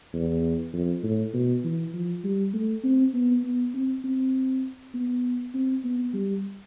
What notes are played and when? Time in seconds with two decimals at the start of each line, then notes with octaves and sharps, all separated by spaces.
0.13 E2
0.73 F2
1.03 A2
1.34 B2
1.64 E3
1.94 F3
2.24 G3
2.54 A3
2.84 C4
3.14 B3
3.44 B3
3.74 C4
4.04 C4
4.94 B3
5.54 C4
5.84 B3
6.14 G3